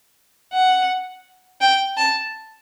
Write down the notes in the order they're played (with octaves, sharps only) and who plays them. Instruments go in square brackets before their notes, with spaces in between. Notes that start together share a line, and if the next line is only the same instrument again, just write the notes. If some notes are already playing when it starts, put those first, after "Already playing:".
[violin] F#5
G5
A5